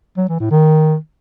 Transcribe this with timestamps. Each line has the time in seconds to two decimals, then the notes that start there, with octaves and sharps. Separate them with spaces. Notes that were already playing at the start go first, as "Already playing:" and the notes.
0.17 F#3
0.29 E3
0.40 A2
0.51 D#3